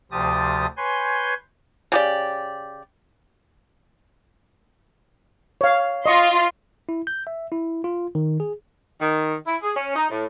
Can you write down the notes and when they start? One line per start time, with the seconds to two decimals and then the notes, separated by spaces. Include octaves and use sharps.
0.11 D2 C3 F3 G4 D#6 A6
0.77 B4 C#5 G#5 C6 G6
1.92 C#3 G4 D5
5.61 C#5 F5
6.06 F4 D#5 C6 C#6
6.89 E4
7.07 G6
7.27 E5
7.52 E4
7.84 F4
8.15 D#3
8.40 G#4
9.00 D#3
9.47 E4
9.62 G#4
9.76 C#4
9.96 D#4
10.11 A2